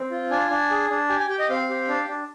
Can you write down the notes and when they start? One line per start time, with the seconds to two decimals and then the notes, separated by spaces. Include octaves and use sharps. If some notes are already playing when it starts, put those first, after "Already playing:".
Already playing: C4
0.11 F4
0.30 D4 G#5
0.50 D4
0.70 G#4
0.90 D4
1.09 G4 G#5
1.19 G#5
1.29 G4 G5
1.39 D#5
1.49 C4 F5
1.69 G4
1.88 D4
2.08 D4